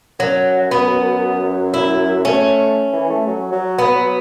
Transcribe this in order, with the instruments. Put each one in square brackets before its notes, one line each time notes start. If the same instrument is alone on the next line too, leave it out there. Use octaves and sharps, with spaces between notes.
[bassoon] F#2 [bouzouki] F#3
[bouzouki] B3
E4
[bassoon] A3 [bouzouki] C#4
[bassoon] E3
A3
F#3
F#3
[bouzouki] B3
[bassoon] F#3